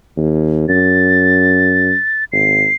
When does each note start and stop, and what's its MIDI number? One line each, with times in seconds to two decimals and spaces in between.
0.17 0.65 39
0.69 1.94 42
0.69 2.24 93
2.32 2.66 32
2.32 2.75 96